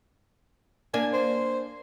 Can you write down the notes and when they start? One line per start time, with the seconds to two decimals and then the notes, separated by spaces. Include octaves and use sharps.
0.94 A#3 D4 G#5
1.13 C5